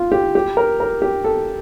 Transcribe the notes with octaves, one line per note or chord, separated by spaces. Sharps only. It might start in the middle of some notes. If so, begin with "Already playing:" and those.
Already playing: F4
G4
G4
A#4
A#4
G4
A4